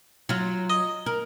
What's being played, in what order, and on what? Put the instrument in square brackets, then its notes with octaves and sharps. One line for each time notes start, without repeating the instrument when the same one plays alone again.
[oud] F#3 F4
[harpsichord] D#5
[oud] A#4